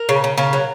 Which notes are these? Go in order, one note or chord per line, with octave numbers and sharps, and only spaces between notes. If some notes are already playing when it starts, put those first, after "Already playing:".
Already playing: A#4
C#3
C#3
C#3 A#4
F#3